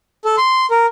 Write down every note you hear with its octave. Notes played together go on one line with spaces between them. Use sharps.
A4
C6
A#4